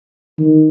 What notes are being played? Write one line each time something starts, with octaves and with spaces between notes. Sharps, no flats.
D#3